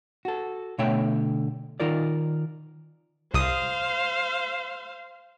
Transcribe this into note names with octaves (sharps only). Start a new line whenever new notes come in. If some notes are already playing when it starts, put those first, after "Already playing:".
F#4 A4
B2 D3 A3 C#5 E5 G5
D#3 D#4 F4 A#4 D5
C2 C5 F5 D#6